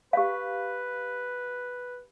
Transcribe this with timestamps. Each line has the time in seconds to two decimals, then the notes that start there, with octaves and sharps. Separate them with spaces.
0.13 G4 B4 F5